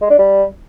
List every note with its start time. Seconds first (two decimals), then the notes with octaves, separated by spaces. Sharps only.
0.02 G#3
0.10 D4
0.18 G3